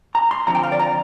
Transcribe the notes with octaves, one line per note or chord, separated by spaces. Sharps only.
A#5
C6
F2 D3 F3 C4 A#5
G5
F5
D5
A#5